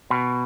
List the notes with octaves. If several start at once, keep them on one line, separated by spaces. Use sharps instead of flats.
B2